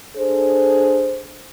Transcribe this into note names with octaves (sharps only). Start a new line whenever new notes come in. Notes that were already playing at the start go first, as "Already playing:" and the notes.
D4 G#4 A4 C5